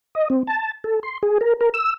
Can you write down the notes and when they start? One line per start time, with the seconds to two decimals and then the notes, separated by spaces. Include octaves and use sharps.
0.15 D#5
0.30 C4
0.47 A5
0.84 A4
1.03 C6
1.23 G#4
1.41 A#4
1.61 A#4
1.74 E6